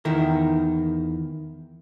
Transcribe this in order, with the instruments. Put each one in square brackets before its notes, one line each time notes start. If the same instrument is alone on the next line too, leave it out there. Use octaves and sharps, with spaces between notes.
[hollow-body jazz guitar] E2 D#3 E4 A#4